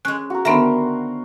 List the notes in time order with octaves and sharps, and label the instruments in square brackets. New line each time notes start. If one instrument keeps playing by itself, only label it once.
[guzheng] G#3 C#4 [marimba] F#6
[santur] F#4 A#4
[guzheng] D3 D#3 [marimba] B3 E5 [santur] A#4 C5